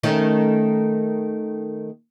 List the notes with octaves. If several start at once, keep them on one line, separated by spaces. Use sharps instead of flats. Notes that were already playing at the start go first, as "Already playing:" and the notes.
D#3 A3 C#4